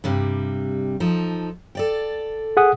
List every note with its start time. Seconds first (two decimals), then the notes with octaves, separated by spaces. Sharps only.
0.04 G2 C3 G3
1.00 F3 D#4 A4
1.75 A4 D5 G5
2.57 G#4 F#5 D#6